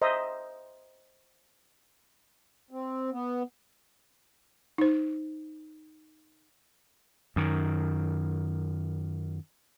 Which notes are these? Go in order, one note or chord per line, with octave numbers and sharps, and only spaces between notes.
C5 D#5 E5 A#5
C4
B3
D#4 C5
F#2 D#3